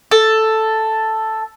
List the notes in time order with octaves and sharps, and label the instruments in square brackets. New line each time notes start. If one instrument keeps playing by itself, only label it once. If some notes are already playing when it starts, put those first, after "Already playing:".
[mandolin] A4